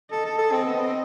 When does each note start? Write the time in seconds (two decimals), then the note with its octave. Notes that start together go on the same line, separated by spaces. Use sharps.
0.11 A4 D#5
0.25 A4
0.38 A4
0.51 C4 D#5
0.65 B3
0.79 C4